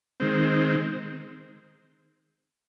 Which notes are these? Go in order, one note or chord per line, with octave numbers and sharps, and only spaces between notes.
D#3 G#3 C4